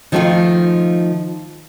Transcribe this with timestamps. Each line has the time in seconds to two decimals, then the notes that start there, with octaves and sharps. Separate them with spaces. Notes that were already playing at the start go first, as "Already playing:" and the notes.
0.12 D#3 F3 A3 B3 D#4 F4